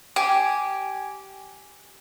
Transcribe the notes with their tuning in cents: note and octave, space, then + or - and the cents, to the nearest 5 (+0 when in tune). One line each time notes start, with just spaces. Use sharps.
G4 -15 G#5 +0